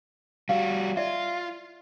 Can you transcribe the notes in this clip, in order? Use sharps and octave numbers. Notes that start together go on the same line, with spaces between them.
G3 F#4 F5
F4 D5 E5